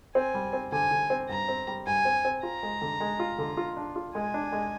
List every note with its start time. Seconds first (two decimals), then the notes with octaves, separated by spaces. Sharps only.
0.15 C4 G#5
0.34 G3
0.53 C4
0.72 D3 G#5
0.91 D3
1.10 C4
1.29 G2 A#5
1.48 C4
1.67 G3
1.86 G2 G#5
2.05 C4
2.25 C4
2.43 F4 A#5
2.63 G#3
2.81 D3
3.00 G#3
3.20 F4
3.38 D3
3.57 F4
3.77 D4
3.96 F4
4.15 G#3 G#5
4.34 D4
4.52 G#3